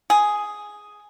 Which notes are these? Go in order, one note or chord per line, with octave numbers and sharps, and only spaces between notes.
G#4